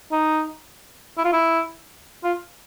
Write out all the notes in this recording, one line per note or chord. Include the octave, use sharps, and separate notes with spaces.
D#4
E4
F4
E4
F4